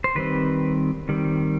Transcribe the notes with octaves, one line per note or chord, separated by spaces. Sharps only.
C5
D#3 G3 C4 B4
D#3 G3 C4